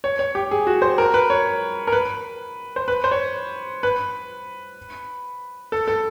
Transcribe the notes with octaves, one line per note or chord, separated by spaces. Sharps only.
C#5
C#5
G4
G#4
F#4
C5
A#4
B4
C#5
A#4
B4
C5
B4
C5
C#5
B4
A4
A4